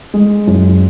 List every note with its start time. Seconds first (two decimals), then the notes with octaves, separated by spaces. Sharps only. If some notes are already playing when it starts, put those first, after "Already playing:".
0.14 G#3
0.47 F#2